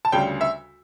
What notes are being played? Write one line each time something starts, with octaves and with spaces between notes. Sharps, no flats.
A5
D2 C#3 G3 G5
E5